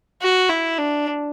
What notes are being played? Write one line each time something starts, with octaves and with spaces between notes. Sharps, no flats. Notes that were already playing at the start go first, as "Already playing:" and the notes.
F#4
E4
D4